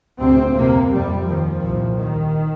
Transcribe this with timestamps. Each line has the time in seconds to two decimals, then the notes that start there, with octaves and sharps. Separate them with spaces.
0.19 D2 C3 C4
0.55 F2 C3 A#3
0.92 F2 C3 G3
1.26 D#2 F3
1.62 C2 A#2
1.97 D#2 D#3